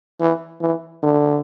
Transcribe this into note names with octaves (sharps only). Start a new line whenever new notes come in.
E3
E3
D3